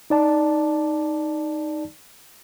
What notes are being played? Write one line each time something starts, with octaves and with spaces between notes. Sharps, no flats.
D#4 D5 A5